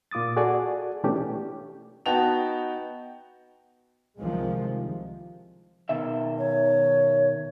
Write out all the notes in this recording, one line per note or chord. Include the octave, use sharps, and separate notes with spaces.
A#2 F4 D6 D#6 A6
F#4 G#4 A4 D5 G#5
B2 E3 A3 C#4 D4 G4
B3 D#4 F#4 G5 A5 F7
C2 C3 D#3 F3 G#3
B2 D#3 E5
C#5